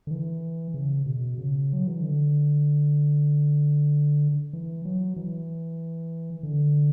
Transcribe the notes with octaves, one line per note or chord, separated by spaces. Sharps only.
D3
E3
C#3
B2
C#3
F#3
E3
D3
E3
F#3
E3
D3